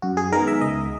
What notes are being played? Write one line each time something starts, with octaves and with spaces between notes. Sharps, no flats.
F#2 F#4
G#4
D#3 G#3 B3 A#4
E5
C#2 D#5